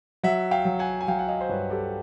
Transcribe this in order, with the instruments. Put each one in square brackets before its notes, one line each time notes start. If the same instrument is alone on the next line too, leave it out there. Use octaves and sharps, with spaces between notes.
[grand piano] F#3 E5 F#5
F5 G5
F#3
F#5 G#5
G#5
F#3 F5 G5
F#5
D#5 F5
C5
G2 B4 C#5
G4 A4